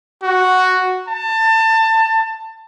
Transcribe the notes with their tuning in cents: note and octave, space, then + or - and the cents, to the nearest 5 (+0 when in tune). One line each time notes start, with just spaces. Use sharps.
F#4 +0
A5 +25